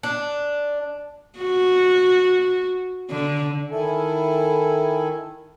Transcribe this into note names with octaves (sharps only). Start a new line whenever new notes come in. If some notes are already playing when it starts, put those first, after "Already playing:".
D4
F#4
D3
D#3 E4 A4 G#5